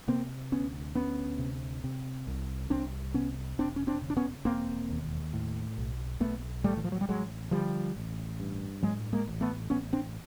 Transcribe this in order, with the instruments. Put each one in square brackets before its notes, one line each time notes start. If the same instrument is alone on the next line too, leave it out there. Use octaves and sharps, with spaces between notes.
[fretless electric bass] C3 A#3 C4
D2 B3 C#4
D2 B3 C#4
C3
C3
C2
C2 C4 D4
C3 B3 C#4
E1 C4 D4
C#4
C4 D4
C#3
D4
B3 C#4
E1 A#3 C4
D#2
A2
B1
B1 A3 B3
A2 G3 A3
E3
F3
F#3
G3
A1 F#3 G#3
D3 F3 G3
A1
G2
A2 F#3 G#3
G#3 A#3
A1
A3 B3
A1 B3 C#4
C4 D4